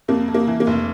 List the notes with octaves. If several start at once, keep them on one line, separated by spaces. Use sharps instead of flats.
F2 A#3
F2
A#3
E3
A#3
F1